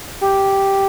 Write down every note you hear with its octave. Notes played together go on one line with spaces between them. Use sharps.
G4